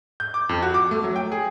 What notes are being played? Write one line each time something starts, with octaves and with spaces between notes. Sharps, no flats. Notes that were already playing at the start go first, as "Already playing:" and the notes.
G6
D6
F2
F#4
D6
A3
F#3
G5
G#4